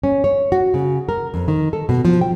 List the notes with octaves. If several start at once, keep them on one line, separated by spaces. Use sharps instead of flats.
C#4
C#5
F#4
C#3
A#4
F2
D#3
A4
B2
F3
G5